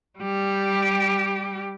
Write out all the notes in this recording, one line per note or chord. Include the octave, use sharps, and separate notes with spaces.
G3 G4